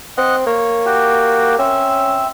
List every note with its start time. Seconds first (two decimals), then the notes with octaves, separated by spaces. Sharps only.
0.18 C4 D#5 F#5
0.46 A#3 C#5
0.86 F#4 G4
1.59 C4 C#4 E5